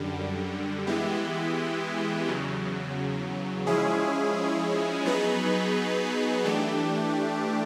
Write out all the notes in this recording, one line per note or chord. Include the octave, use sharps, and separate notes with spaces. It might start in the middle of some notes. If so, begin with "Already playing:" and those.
Already playing: F#2 D3 G3
E3 G#3 B3 E4 G4
E2 C#3 F#3
F3 G#3 C#4 E4 G#4
F#3 B3 D#4 G#4 B4
E3 A3 D4 G4